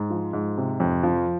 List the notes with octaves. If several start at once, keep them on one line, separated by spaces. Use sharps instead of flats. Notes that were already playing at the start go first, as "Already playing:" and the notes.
Already playing: G#2
F3
G#2
C3
F2
F3